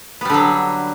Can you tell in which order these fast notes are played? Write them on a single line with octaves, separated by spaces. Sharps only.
B3 G3 D3 F#3